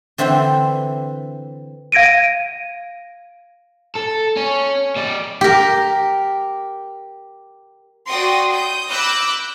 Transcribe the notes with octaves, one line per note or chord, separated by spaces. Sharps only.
D3 E3 C4 E5 G5
F5 G#6 A#6 D7 D#7
A4
C#4
G#3 D5
G4 A#4
F#4 D5 G5 C6 D#6 A#6
D#6 G6
B5 D6 E6 F#6 G6 A#6